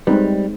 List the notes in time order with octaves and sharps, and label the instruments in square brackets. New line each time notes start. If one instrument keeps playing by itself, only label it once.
[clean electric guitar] G3 [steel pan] G#3 C4 D#4 B4